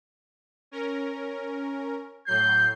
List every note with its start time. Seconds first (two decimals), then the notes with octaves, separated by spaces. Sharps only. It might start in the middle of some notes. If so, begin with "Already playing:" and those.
0.71 C#4 A#4
2.26 A2 F#3 G6 C7